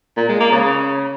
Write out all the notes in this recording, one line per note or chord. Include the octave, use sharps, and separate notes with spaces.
A#2
G#3
A#3
C#3